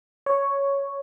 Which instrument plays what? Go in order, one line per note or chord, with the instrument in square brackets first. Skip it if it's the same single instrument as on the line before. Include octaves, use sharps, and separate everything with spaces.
[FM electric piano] C#5